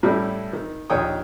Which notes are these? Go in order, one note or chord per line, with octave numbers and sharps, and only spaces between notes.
A2 G3 A3 C#4 E4
D#3
A#1 D#2 C#5 G5 D#6